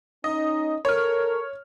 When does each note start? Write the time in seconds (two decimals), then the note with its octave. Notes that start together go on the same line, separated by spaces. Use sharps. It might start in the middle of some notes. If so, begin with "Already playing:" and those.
0.24 C#4 D#4 D#5
0.85 A4 A#4 C#5 F6